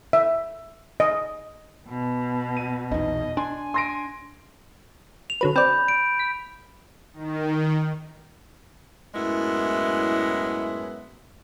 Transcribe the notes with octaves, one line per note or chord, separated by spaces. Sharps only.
E5
D#5
B2
D#7
A#1 E2 D#4 D#5
D4 G#5 C6
C6 A#6 D7
F7
D3 F#3 B4
C4 D5 B5 G6
D7
B6
D#3
F#2 A2 G#3 B3 E4